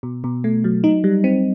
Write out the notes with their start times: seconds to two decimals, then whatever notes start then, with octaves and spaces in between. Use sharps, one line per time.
0.03 B2
0.24 B2
0.44 A3
0.64 F#3
0.84 D#4
1.04 G3
1.24 C4